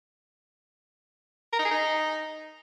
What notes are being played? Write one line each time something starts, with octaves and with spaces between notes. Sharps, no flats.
A#4
D#4
G#4
D#4